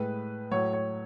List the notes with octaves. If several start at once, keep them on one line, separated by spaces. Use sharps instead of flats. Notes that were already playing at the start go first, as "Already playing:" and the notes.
Already playing: A2 G#3 B4
A2 F#3 C#5
C#5